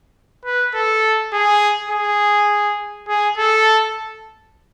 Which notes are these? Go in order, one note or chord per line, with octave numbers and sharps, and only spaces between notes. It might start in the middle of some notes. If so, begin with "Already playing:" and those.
B4
A4
G#4
G#4
G#4
A4